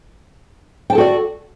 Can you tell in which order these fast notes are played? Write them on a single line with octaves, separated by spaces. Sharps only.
G5 A5 A4 F#4 D5